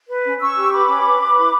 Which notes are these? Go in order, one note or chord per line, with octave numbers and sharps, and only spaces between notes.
B4
C#4
C#4 C#6 E6
G4
B4 B5 D6
C#4
B4
B4
E4